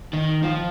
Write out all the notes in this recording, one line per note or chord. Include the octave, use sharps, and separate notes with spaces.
D#3
F3